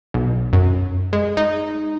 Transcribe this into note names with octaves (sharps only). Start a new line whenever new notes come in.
B1
F#2
G#3
D#4